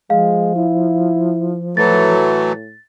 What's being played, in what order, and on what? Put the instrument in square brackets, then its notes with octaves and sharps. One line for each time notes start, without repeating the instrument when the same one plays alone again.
[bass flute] F3 [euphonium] G#3 [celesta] F5
[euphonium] E4
[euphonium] A2 [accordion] E3 F#3 A3 [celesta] A6